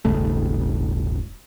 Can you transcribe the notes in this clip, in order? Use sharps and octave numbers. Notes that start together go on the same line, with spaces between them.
D#1 G#1 C#3 A3